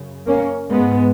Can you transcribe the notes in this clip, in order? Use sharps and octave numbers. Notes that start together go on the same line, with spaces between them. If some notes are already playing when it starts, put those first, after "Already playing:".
Already playing: F#2 C#3
A#3 C#4
G#2 G#3 B3